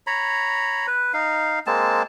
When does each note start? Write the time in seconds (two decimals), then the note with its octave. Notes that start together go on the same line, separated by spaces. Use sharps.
0.07 C#5 A#5 B5
0.87 B4
1.14 D#4 F5
1.67 G#3 A#3 C4 A5